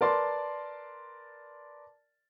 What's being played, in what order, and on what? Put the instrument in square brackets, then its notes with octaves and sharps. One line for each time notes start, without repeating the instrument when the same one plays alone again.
[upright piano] A#4 B4 D5 A5 C6